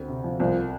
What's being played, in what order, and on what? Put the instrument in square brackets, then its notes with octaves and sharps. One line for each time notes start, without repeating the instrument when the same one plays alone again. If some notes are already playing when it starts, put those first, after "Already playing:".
Already playing: [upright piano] D2 C4
C3
F3
[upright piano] C2 [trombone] F3